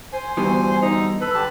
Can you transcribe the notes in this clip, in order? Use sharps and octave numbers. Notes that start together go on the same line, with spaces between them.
C5 G#5
D2 G2 B2 E3 G#5
D3 D#4
A4 B4
D3 G4 A5